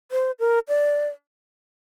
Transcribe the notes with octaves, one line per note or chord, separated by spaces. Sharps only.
C5
A#4
D5